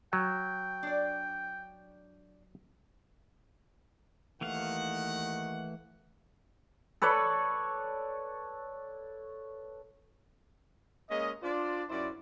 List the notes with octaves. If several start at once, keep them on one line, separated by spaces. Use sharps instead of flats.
F#3 G5
D4 D5
D#2 D#3 E3 A3 F5 F#5
A4 B4 C#5 D5
G#3 A#3 C#4 D#5
D4 F4 C5 D5
F#2 E4 C5 D5